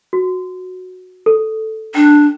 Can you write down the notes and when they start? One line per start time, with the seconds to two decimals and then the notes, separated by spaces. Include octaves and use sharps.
0.13 F#4
1.26 A4
1.95 D4 G5